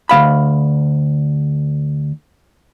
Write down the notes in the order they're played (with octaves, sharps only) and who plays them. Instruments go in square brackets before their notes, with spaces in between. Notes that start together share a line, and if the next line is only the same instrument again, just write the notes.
[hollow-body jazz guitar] D2 E3 F5 B5